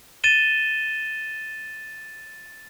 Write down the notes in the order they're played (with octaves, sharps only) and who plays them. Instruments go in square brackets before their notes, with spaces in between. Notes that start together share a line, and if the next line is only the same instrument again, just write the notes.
[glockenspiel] A6 D#7 E7 G7